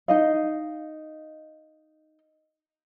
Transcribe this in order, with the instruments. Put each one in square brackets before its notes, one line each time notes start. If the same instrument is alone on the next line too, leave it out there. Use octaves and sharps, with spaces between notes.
[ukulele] D#4 D#5 F5